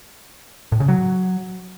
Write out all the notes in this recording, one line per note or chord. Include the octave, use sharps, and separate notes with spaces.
A2
C#3
F#3